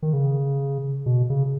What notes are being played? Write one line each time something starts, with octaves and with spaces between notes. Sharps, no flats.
D#3
C#3
B2
C#3